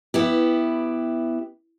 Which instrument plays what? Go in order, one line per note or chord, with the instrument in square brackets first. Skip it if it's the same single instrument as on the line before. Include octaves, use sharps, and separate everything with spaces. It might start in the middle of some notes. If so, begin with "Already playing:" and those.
[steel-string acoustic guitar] B3 E4 G4